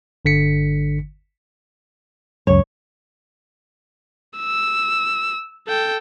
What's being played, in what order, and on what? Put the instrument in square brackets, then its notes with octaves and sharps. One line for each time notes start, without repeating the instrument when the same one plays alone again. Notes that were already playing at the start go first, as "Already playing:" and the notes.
[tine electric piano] G1 D3 B6 C#7
[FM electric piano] C#2 F#2 [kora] C#5
[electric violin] E6
A4 G5